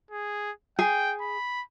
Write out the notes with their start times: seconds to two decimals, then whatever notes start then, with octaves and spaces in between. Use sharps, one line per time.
0.11 G#4
0.79 G#4 G5
1.21 B5